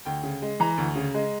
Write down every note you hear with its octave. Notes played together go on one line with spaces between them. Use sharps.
D2 G5
C#3
G#3
E3 A#5
D2
C#3
G#3